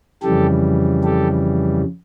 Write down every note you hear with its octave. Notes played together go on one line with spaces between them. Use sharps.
F2 C#3 E3 G3 G4 A4
G4 A4